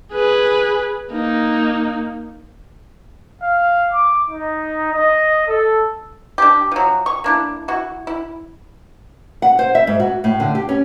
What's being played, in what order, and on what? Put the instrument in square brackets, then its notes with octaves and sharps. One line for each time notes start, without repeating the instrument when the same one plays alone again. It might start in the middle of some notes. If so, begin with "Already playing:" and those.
[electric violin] G#4 B4
A#3 D#4
[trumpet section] F5
D6
D#4
D#5
A4
[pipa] D4 G4
F3 F#3
C#6
A#3 D4 E4
E4 F#4
E4
[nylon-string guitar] F#5
C5
E5
G#2
F#4
A2
D3
G4
C#4